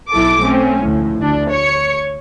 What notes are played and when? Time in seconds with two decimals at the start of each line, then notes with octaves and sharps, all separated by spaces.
0.10 B1 F#3 E4 A4 D6
0.41 A3 C4 C#4
0.84 D2 A2 F3
1.19 D2 D4
1.51 C#5 C#7